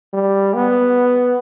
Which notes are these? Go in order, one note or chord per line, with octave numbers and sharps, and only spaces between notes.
G3
B3